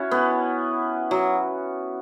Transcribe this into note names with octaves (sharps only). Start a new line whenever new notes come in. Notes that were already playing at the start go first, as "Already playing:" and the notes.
Already playing: C#4 E4 F#4
B3
F#3